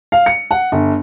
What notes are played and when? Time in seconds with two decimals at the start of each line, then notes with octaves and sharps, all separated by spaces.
0.12 F5
0.26 C#7
0.51 F#5
0.72 G1